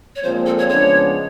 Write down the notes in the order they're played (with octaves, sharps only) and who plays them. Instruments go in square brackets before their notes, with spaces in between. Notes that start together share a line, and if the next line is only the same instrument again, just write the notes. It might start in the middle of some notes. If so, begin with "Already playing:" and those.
[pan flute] C#5
[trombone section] A#2 F3 G#3 C4 [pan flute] C5
[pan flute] A4
C#5
[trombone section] C#3 F3 G#3 B3 D4 [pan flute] C#5